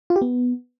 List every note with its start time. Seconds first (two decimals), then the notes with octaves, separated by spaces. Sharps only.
0.10 F4
0.16 G4
0.22 B3